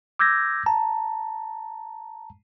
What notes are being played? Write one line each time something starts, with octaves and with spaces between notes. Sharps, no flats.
D6 E6 G6 G#6 A#6
A5 A#5